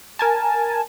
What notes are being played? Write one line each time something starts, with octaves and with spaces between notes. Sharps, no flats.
A#4 G#5 A5